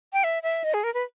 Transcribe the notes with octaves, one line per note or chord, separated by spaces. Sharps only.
G5
E5
E5
D#5
G#4
A#4
B4